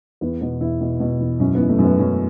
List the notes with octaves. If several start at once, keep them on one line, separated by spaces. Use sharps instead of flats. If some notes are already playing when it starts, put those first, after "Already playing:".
E2 B3
B2 B3
E2 E4
B2
B2
E2
F#2 C#4
E3 B3
A3
F#2
B3
F#2 C#4